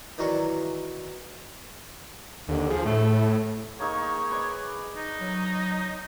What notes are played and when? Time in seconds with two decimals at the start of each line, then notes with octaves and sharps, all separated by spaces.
0.18 D#3 E3 F#3 A#4 D5 C#6
2.49 D#2 D3
2.70 F3 G#4
2.85 A2 A3
3.80 A#3 D#4 G#4 C#5 C#6
4.31 B4 D5 D#5
4.96 D#4
5.21 F#3